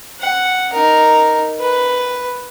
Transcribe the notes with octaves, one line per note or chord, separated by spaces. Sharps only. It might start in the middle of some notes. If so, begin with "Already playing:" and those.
F#5
D#4 A#4
B4